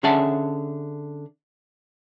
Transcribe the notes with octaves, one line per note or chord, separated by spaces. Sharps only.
D3 C#4 G#4 E5 F#5 A5